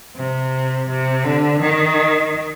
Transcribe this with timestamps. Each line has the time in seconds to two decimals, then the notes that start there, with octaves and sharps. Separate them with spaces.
0.16 C3
0.89 C3
1.24 D3
1.61 D#3